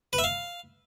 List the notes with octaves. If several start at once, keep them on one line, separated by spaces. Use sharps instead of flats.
B4
E5
F5